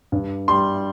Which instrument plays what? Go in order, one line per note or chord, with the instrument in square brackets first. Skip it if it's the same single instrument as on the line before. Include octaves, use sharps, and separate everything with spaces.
[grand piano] G2
[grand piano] G3 [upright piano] C6